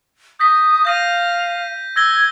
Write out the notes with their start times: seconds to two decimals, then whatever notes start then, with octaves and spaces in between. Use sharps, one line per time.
0.39 D#6 G6 A#6 B6
0.85 F5 G6 A#6 D#7
1.96 E6 G#6 A#6 G7